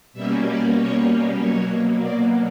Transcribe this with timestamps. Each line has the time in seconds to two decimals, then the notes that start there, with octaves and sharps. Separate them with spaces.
0.13 B2 G3 A#3 C#4 E5
0.44 D5
0.75 C#5
1.38 B2 F#3 A#3 C#5
2.00 D5